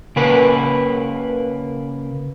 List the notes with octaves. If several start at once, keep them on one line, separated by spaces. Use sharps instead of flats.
C#3 A#3 B4